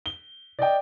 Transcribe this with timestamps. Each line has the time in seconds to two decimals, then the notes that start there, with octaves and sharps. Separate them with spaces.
0.06 G7
0.59 D5 D#5 G5